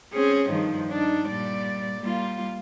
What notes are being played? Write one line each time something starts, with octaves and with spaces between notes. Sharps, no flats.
C4 C#4 G#4
G2 D#3 F3
D4 D#4
A#2 G3 D5
G3 A#3 F4